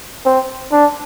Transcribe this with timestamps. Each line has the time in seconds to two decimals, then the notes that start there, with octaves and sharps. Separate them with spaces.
0.26 C4
0.72 D4